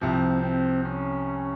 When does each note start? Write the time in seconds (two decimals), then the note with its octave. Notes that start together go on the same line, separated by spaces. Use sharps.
0.01 C2 C3 F3 C4
0.43 C4
0.85 C#4